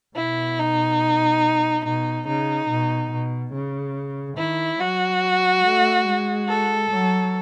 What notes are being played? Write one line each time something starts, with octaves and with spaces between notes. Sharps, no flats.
B2 E4
D#4
B2 D#4
C#3 D#4
B2
B2
C#3
D#3 E4
F#3 F#4
A3
G#3
A4
F#3